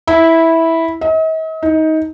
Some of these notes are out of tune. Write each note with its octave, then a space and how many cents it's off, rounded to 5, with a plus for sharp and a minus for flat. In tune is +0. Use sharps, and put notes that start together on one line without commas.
E4 -10
D#5 +45
D#4 +20